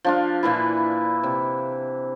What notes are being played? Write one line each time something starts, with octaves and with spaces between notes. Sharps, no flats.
F3 D4 F4
A#2 E3 E4
C3